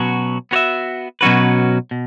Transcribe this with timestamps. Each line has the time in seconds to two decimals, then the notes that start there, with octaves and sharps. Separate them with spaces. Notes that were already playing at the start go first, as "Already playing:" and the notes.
Already playing: B2 F#3 C#4 F#4
0.51 B3 F#4 C#5 E5
1.21 B2 F#3 C#4 F#4 B4
1.91 B2